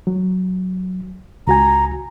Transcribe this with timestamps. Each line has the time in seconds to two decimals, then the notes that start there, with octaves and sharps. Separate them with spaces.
0.07 F#3
1.47 C#2 F#4 G#5 A#5